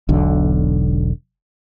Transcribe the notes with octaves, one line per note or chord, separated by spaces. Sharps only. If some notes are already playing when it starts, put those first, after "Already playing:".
E1 B1 D3